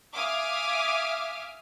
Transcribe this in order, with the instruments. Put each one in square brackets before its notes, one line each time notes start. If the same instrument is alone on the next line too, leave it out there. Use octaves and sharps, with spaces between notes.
[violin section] E5 F5 G#5 D6 D#6 F6